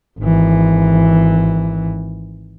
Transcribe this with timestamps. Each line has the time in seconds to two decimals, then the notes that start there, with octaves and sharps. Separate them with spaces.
0.19 G#1 E3